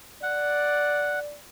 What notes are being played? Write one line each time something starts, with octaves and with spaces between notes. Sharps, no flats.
D5 F#5